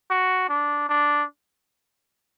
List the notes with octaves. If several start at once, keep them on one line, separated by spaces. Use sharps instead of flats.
F#4
D4
D4